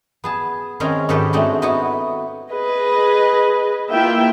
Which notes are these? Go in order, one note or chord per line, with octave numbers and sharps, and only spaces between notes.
B3 G#4 A5
D#3 G#3 C4 C#4 A#4
G#2 D#3 F#4 G4 A4 B4
G#3 A3 C4 D4 D#4 F#4
B3 D#4 E4 F#4 B4
G#4 B4 D#5
A#3 E4 F4 E5 G5